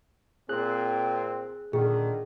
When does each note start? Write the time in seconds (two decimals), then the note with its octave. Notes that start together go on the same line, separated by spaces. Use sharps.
0.49 A#2 C4 G#4 F#6
1.73 A#2 D3 D#3 G#4